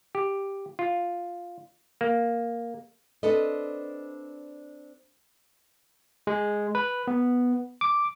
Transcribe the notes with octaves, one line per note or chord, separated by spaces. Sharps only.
G4
F4
A#3
C4 D4 A4 B4 D#5
G#3
B4
B3
D6